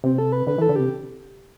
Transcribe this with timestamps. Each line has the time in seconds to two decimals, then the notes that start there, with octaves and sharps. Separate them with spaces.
0.04 C3 C4
0.18 A4
0.32 B4
0.47 D3 B4
0.58 E3 A4
0.69 D3
0.76 C3 G4